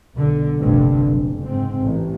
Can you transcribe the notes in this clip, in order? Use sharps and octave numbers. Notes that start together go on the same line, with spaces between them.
B1 D3
F1 A#1 G2 D3
F#1
G#2 C4
A1